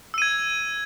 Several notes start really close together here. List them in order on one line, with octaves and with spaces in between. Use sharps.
E6 D#7 G#6